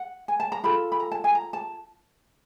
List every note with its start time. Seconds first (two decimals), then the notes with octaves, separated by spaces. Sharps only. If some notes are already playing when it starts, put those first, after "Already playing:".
Already playing: F#5
0.28 G#5
0.40 A5
0.52 A#5
0.64 F4 A4 B5
0.92 B5
1.00 A#5
1.12 A5
1.24 G#5
1.35 A#5
1.53 A5